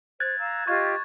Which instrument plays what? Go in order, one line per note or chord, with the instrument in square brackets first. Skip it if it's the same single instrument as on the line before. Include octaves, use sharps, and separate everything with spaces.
[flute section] C5 [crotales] F#6 G#6 A6
[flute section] F5 A#5 E6
[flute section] F4 G4 D#5 [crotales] C#6 G#6